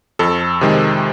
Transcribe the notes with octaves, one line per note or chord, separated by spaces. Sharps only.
F2 A4
C3 D#3 G#3